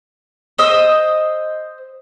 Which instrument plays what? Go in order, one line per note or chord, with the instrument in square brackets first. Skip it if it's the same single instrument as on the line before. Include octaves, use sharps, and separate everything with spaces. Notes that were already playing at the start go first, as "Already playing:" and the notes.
[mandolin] C5 D#5 E6